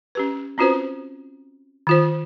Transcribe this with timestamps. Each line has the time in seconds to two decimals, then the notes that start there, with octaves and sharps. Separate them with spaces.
0.15 C#4 G4 B4
0.58 C4 C#4 F4 F#4 B4 C5
1.87 D#3 F4 C5